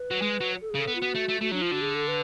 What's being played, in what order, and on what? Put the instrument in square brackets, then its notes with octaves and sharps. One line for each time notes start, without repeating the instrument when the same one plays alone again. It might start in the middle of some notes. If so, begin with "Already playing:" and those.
Already playing: [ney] B4
[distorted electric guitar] F#3
G#3
F#3
[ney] A4
G#4
[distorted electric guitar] C#3 [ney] A4
[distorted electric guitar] B3
[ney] F4
[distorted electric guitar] B3 [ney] F#4
[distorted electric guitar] A3
A3
[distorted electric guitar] A3 [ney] F#4
[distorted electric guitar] F#3 [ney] D4
[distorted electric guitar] F3 [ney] F4
[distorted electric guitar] D3 [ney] F#4
[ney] G#4
A4
B4